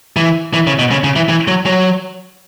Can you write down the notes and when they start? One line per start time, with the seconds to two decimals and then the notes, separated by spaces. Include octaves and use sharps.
0.16 E3
0.54 E3
0.67 C#3
0.79 B2
0.91 C#3
1.04 C#3
1.16 E3
1.29 E3
1.48 F#3
1.66 F#3